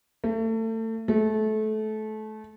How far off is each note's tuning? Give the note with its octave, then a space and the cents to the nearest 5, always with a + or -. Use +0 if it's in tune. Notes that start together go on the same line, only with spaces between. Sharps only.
A3 +30
A3 -25